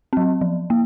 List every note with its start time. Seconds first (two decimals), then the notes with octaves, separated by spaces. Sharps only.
0.13 F#3 C4
0.41 F3
0.70 A#3